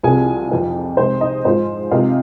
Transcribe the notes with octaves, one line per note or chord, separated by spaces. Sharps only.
C2 C3 F3 C4 F4 G#4 G#5
F2 F3 C4 D#4
C3 G#3 D#4 C5
D#4 D#5
G#2 F3 G#3 F4 C5
C3 G#3 C4 D#4 F4 F5